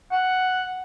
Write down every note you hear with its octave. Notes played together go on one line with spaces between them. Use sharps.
F#5